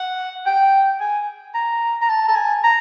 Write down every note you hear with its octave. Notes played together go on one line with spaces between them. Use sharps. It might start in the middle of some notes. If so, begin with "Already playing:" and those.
Already playing: F#5
G5
G#5
A#5
A#5
A5
A5
G#5
A#5